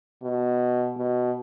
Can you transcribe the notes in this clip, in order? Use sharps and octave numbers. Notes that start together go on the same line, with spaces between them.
B2
B2